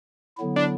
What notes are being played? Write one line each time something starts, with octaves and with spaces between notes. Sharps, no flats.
D3 F#3 B3 E4
D4